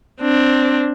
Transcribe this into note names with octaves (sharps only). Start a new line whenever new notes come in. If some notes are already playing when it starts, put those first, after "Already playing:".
C4 D4